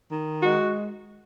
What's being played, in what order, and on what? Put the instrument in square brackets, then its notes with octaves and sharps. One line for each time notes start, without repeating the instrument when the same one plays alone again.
[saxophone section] D#3
G#3 F#4